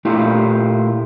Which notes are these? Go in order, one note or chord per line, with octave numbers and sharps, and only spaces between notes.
A#2 A3 E4 F4 G4 A#4